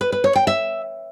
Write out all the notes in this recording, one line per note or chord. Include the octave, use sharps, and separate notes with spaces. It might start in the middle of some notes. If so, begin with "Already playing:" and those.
B4
B4
C#5
G5
E5